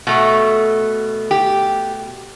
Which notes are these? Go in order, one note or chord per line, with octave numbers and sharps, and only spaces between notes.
B2 A3
G4